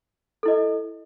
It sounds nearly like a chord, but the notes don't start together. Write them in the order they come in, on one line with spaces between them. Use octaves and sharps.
A4 E4 D#5